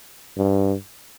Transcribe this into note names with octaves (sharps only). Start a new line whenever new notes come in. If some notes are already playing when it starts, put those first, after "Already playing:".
G2